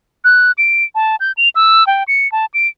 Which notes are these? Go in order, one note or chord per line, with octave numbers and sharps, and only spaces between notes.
F#6
D7
A5
G6
F7
E6
G5
C#7
A5
D7